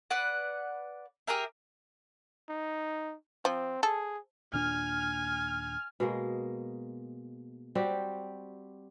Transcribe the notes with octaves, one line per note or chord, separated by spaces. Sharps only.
B4 D5 F#5
G4 G#4 A#4 E5
D#4
F3 C4
G#4 A4
D#2 A#2 D4 G#5 F6
B2 G#3 A#3
G3 C4 F#4 G4